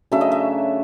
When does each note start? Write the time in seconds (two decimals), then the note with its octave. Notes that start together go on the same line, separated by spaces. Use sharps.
0.12 C#3 F#3 A3 D4 E5
0.21 D#5
0.32 E5